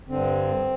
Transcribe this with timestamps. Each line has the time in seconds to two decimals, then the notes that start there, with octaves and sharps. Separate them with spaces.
0.09 G2 D3 C4